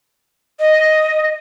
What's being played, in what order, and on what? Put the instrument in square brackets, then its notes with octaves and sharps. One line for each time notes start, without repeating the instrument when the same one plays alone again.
[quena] D#5